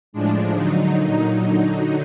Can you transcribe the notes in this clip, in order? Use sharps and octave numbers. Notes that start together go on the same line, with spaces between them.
A2 F3 G#3 D4
D3 F#3 D#4
A#2 F#3
D3 F#3